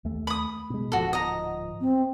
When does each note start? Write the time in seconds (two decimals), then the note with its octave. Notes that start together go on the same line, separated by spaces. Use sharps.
0.05 D#2 A3
0.27 B5 D#6
0.70 B2 G#3
0.92 D1 G#2 F3 F#4 A4
1.13 D#5 A#5
1.81 C4